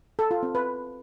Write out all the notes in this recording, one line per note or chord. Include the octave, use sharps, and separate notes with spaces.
A4
F4
C4
B4